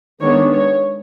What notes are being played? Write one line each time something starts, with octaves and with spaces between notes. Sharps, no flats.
D#3 G#3 B3 D4 C#5
C#5